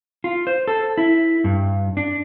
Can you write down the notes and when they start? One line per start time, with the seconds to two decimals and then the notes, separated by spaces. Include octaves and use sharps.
0.24 F4
0.47 C5
0.68 A4
0.98 E4
1.44 G2
1.97 D4